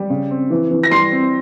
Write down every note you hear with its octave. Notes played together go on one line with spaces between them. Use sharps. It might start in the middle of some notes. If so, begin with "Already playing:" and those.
Already playing: G3
C#3
C4
E3
E3
A#6
G3 C6 C7
C4